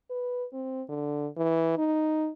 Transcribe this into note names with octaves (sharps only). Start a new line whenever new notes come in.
B4
C4
D3
E3
D#4